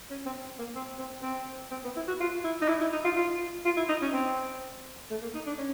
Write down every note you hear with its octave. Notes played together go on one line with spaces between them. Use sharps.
C#4
C4
A#3
C4
C4
C4
C4
B3
E4
F#4
F4
E4
D#4
E4
E4
D#4
F4
F4
F4
E4
D#4
C#4
C4
A3
A#3
D#4
D4
C#4